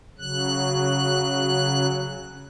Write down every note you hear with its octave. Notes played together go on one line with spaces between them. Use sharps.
C#3 F#3 F#6